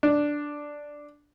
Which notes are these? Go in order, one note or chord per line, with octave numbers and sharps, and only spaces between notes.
D4